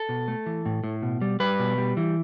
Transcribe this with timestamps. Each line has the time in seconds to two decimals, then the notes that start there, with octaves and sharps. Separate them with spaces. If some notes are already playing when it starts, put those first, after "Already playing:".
Already playing: A4
0.09 B2
0.28 A3
0.46 E3
0.66 A2
0.84 A2
1.02 B2
1.21 G3
1.40 G3 B4
1.59 B2
1.78 G3
1.97 E3